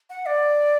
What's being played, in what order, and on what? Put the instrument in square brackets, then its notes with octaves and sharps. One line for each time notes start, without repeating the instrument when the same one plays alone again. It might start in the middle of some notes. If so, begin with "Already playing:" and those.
[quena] F#5
D5